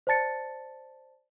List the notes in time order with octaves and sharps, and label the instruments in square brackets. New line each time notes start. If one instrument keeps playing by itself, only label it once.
[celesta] C5 D5 A5 A6 C#7